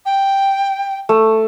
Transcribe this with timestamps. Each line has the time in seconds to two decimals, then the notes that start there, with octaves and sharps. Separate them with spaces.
0.06 G5
1.09 A3